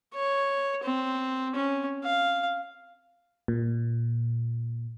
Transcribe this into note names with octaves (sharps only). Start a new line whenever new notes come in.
C#5
C4
C#4
F5
A#2